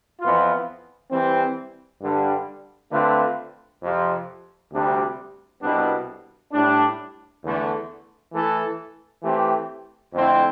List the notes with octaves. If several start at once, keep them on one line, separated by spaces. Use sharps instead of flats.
F2 E3 B3 F4
E3 G3 C4
G2 D3 G3 D4
D3 A3 C4 F4 B4
F2 C3 F3
D2 C3 G3 D4 G4
C2 B2 G3 B3 D4
A2 G3 D4
E2 D3 A3
E3 A3 E4 A4
E3 A3 C4 G4
F2 D3 A3 C4 E4